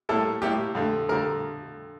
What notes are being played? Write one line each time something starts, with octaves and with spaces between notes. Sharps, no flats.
A2 G3 A#3 E4 A4
A2 G3 A#3 E4 G4
F2 D3 A3
F2 D3 A3 A#4